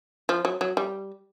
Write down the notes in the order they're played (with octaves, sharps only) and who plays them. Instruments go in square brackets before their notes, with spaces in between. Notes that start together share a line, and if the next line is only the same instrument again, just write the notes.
[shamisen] F3
F#3
F#3
G3